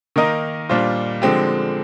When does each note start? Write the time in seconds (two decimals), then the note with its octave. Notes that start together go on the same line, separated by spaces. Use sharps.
0.16 D#3 A#3 D#4 A#4 D#5
0.69 A#2 G3 D4 F4 C5
1.22 D3 F3 G#3 C4 G4